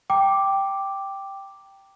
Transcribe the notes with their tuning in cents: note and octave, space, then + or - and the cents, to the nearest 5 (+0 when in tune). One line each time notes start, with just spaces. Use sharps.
G5 +0 A#5 -10 D6 +0